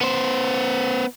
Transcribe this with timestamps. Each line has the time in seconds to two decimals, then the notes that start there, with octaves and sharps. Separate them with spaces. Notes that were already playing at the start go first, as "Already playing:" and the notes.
0.01 B3 C5